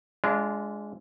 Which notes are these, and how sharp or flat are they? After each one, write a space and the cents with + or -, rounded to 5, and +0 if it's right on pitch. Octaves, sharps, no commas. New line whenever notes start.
G#3 +0 D4 -25 F4 -30